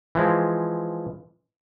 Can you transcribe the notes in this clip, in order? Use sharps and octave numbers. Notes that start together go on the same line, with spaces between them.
E3 F3 G#3